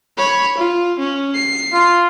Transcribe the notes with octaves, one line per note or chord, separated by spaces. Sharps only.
C#5 B5
F4
C#4
C7
F4